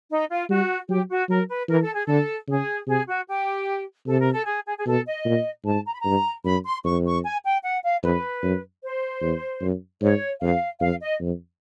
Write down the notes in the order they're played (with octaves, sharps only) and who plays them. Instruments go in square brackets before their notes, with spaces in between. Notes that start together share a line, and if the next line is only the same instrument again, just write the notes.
[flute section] D#4
F4
[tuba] G3 [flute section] F#4
[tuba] F#3 [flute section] G4
[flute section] F#4
[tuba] F#3 [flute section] A#4
[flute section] B4
[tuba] E3 [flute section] A#4
[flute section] A4
G#4
[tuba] D3 [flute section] A4
[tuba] C#3 [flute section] G#4
[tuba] C3 [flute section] G#4
[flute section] F#4
G4
[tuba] C3 [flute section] A4
[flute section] A#4
A4
G#4
G#4
G#4
[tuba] B2 [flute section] A4
[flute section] D#5
[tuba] A#2
[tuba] G#2 [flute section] A5
[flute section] A#5
B5
A#5
[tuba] G2
[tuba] F#2 [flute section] B5
[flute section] C6
[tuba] F2 [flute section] C#6
[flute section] C#6
G#5
G5
F#5
F5
[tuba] F2 [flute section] B4
[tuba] F#2
[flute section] C5
[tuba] E2
F#2
[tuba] G#2 [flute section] C#5
[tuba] F2 [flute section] F5
[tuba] F2 [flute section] F5
[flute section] D#5
[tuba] F2